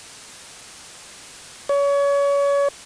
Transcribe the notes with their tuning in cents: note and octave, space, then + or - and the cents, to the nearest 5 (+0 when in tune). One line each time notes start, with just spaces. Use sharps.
C#5 +30